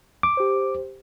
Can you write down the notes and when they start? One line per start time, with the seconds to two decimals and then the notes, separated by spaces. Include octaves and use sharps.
0.23 D6
0.37 G4 C5